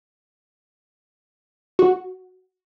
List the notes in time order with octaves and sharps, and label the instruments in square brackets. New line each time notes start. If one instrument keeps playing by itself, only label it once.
[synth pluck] F#4